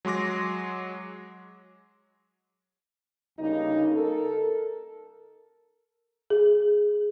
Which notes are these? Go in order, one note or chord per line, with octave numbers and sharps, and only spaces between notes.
F#3 G#3 C6 D6 A#6
D2 C#3 G3 A#3 D#4
A4 A#4
G#4